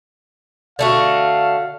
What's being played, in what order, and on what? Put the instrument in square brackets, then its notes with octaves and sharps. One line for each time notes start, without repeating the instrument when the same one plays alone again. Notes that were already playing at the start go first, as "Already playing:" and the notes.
[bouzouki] D3 A3 F#4 [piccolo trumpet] F5